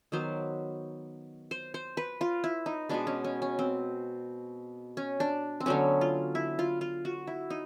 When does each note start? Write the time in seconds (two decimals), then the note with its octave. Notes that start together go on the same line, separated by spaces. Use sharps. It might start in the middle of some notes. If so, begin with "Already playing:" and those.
0.12 D#3 F#3 B3 C5
1.51 C5
1.74 C5
1.97 B4
2.21 F4
2.44 E4
2.66 D#4
2.89 B2 G#3 B3 D4
3.07 C#4
3.24 C#4
3.42 C#4
3.59 C4
4.97 C#4
5.20 D4
5.60 C4
5.66 D3 F#3 B3 C#4
6.01 F4
6.35 E4
6.59 F4
6.81 F4
7.05 F#4
7.27 E4
7.50 D#4